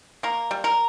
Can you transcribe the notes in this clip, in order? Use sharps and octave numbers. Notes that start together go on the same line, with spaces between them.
A#3 A#4
G3
A#4